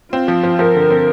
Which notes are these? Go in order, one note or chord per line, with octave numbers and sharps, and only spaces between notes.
C4 F4
F3
F3
F3 A#4
D3
C4